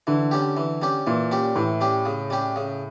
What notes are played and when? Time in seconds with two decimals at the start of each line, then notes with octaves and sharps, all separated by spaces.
0.07 D3 E3
0.31 G3 C#4 G4
0.57 E3
0.82 G3 C#4 G4
1.07 A#2 E3
1.31 G3 C#4 G4
1.56 A2 E3
1.81 G3 C#4 G4
2.06 C#3
2.30 G3 C#4 G4
2.56 C#3